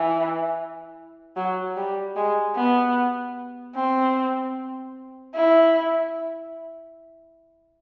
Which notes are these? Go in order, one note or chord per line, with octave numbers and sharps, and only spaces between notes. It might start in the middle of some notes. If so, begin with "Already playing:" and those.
Already playing: E3
F#3
G3
G#3
B3
C4
E4